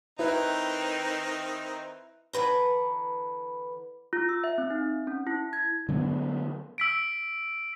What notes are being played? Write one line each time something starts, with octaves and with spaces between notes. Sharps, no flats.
D#3 C4 D#4 E4 B4
D3 E3 B4 A#5
F4
E6
E5
C4
D#4
C#4
E4
G#6
D3 F#3 G#3 B3
E6 B6 D7